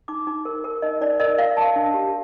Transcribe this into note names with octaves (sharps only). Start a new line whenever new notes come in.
D#4 D6
D#4
A#4
A#4
D#4 D#5
D#4 D5
A#4 D#5
A#4 F5
A#4 A5
D4
G4